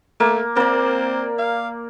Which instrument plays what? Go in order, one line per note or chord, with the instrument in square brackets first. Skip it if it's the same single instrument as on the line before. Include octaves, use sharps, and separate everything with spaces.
[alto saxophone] A3 [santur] A#3
[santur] A#3 D5 [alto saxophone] C4
[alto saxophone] F5